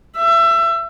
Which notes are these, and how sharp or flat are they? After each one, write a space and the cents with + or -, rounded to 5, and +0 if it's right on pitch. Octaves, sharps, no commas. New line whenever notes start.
E5 +25